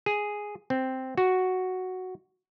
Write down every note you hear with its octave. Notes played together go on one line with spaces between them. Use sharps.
G#4
C4
F#4